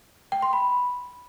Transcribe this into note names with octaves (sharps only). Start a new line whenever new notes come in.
G5
C6
B5